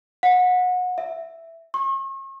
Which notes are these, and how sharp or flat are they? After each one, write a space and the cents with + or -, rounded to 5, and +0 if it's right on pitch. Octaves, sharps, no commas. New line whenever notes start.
F#5 -30
E5 +0
C#6 -40